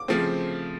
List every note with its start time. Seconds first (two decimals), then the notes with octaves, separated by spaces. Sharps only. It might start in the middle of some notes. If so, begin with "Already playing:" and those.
Already playing: D6
0.08 C#3 F3 A3 C4